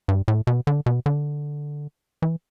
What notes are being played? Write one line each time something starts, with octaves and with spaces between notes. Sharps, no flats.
G2
A2
B2
D3
B2
D3
E3